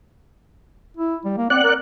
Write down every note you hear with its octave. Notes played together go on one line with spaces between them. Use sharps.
E4
G3
A#3
C4 D5 F#5 F#6
A#4